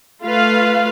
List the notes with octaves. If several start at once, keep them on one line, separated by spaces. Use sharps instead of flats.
A3 F4 B4 F5